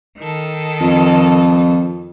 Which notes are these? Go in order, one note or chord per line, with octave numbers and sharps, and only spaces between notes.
D#3 A4
F2